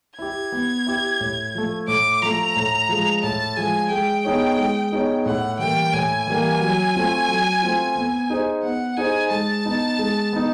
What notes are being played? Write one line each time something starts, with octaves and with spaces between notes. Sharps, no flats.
E4 G4 G#6
B3
E4 G4
A2
F3 A3
A2 D6
F3 A3 A#5
A2
F3 G#3
A2 A5
F3 G#3 G#5
G#3 G5
B3 D#4 G#4 C#5
G#3
B3 D#4 G#4 C#5
A2 F#5
E3 G3 A#3 G5
A2 G#5
E3 G3 A#3
F#3
A3 C4 F4
F#3
A3 C4 F4
B3
D#4 G#4 C5
B3 F#5
D#4 G#4 C5 G#5
G#3 A5
B3 D#4
G#3
B3 D#4